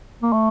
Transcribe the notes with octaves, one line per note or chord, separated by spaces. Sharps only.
A#3
A3